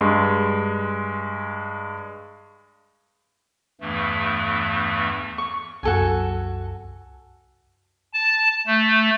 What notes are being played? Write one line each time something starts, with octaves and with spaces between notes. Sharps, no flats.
G2 G#3 C6
E2 G2 E3 A3
C#6
C2 F#2 F#4 A4 G#5
A5
A3